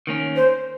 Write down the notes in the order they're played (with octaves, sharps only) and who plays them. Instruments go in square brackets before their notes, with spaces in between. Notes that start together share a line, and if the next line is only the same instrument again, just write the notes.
[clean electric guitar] D#3 A#3 C#4
[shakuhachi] C5